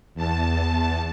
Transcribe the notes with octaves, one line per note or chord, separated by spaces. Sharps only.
E2 A5